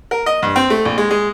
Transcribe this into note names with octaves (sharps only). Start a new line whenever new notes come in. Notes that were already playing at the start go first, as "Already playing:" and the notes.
A#4
D#5
G2
C4
A3
A#1
G#3
G#3